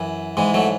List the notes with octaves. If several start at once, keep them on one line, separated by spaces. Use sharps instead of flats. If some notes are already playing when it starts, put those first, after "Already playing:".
Already playing: F#2 E3
G#2 E3 G#3
F#3 A3